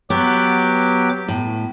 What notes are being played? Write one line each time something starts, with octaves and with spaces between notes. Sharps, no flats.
F#3 B3 G4 D6
A2